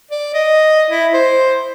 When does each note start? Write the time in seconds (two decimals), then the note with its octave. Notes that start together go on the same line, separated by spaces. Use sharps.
0.11 D5
0.34 D#5
0.90 E4
1.14 C5